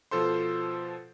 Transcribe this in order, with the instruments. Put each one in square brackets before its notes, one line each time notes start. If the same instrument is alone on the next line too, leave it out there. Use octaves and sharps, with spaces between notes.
[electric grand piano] B2 F3 F4 A4 C5 C6